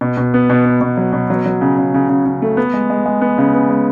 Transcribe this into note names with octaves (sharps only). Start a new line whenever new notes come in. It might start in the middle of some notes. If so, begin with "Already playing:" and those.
B2
B2
B3
B2
B3
B2
F#3
B2
F#3
F#3
C#3
C#3
C#3
C#3
C#3
A3
B3
G#3
G#3
G#3
B3
C#3
B3
G#3